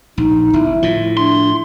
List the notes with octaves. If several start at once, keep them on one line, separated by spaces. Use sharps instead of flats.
A#1 D#4
G1 E4
A2 F3 F4
D4 E4 C6